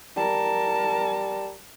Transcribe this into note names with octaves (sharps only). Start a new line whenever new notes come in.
G3 A#4 A5